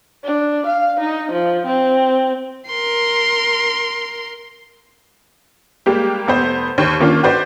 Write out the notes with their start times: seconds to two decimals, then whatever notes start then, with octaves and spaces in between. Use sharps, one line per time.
0.24 D4
0.66 F5
1.00 D#4
1.32 F3
1.66 C4
2.68 A#4 C6
5.86 G3 G#3 A#3 G4
6.27 F1 B3 C5
6.78 D#2 G4 C5
7.00 D#3 A#3 C#4 D4 F4
7.23 F#4 B4 C5 D5